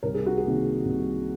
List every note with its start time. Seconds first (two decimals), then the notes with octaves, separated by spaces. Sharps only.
0.03 C2 A#4
0.14 G#4
0.26 F#4
0.38 G#4
0.45 C3 D#3 A#3
0.85 C2